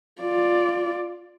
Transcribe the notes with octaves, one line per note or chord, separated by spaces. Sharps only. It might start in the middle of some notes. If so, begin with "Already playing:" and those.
F4 D5